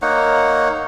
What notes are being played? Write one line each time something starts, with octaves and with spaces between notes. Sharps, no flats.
A#3 D#4 C#5 F#5